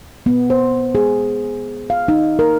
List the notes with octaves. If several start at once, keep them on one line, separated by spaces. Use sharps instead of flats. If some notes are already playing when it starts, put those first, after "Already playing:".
B3
C5
G#4
F5
D#4
A#4